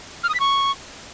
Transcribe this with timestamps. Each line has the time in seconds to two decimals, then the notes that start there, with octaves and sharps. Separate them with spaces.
0.24 F6
0.29 D#6
0.34 B6
0.40 C#6